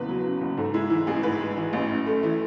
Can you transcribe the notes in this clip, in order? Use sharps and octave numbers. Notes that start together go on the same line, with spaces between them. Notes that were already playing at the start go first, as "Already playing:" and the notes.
Already playing: F#1 E2 C#3 B4
F#3
C#3
F#1
G#2 A4
G#3 E4
E3 E4
A1 G#4
G#2 B4
G#3
E3
A1
F#2
A3
E3